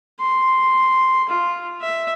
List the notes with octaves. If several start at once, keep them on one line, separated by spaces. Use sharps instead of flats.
C6
F4
E5